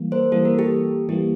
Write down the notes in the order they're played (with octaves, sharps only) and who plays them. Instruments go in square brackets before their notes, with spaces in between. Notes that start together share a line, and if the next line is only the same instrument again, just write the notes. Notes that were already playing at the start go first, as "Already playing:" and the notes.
Already playing: [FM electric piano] E3 G3 A#3
[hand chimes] A#4 C5
[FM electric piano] E3 G3 A#3 [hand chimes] A4
[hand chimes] A#4
G4 A4
[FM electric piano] E3 G3 A#3 [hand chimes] G4